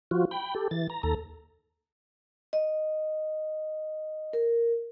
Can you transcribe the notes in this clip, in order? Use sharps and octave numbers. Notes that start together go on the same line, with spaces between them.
F3 F4 F#4
G5 B5
G4 A4
E3 A6
A#5
D#2 A4 A#5
D#5
A#4